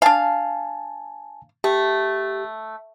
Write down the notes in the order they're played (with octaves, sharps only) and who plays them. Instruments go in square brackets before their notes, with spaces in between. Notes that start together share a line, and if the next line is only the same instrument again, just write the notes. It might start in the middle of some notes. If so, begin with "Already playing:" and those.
[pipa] D4 F5 [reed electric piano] G#5 A5
[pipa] A3 [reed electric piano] G4